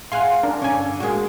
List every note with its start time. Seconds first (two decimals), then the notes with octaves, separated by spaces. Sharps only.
0.12 G#4 F5 F#5 G#5 C6
0.43 D4 A#4
0.62 G2 D3 C#4 G#5
1.00 G#3 A#3 F#4 G#4